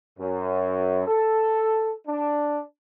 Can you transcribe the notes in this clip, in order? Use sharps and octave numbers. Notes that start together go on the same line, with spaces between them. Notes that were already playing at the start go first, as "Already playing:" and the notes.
F#2
A4
D4